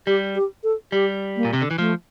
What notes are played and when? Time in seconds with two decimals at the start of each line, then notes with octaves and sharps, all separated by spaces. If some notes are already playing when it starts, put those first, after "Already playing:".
0.07 G3 G4
0.35 G4
0.64 A4
0.92 G3 G4
1.36 A#3
1.45 A#2
1.53 C3
1.62 D3
1.71 E3
1.78 F3 A3